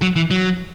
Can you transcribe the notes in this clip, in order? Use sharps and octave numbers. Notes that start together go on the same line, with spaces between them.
F#3
E3
F#3